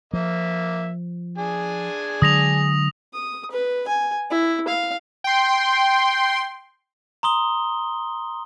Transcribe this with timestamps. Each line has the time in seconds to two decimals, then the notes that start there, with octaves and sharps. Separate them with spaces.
0.13 F3 A#3 E5
1.38 D4 G#4 G#5
2.22 D3 F#3 G#3 D#6 A#6 F7
3.13 D#6
3.51 B4
3.87 G#5
4.30 E4
4.68 F5
5.24 G5 C6
7.23 A#5 C6 D#6 G7